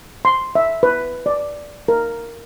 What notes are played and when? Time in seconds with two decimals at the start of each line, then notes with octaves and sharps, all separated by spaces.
0.25 C6
0.55 E5
0.83 B4
1.26 D5
1.88 A#4